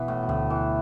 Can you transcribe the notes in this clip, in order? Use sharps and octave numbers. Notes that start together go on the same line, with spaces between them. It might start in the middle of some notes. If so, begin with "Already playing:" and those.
Already playing: B2 E3 B3
A2
B2
D2 A2 D3
E3